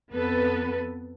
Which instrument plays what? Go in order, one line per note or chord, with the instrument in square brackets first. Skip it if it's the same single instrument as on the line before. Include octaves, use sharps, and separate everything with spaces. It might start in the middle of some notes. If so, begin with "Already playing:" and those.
[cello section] F2 B3 A4 B4